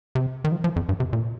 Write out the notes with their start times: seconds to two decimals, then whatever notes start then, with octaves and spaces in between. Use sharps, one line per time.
0.15 C3
0.44 D#3
0.52 F3
0.64 F3
0.76 F2
0.89 G2
1.00 C3
1.13 A#2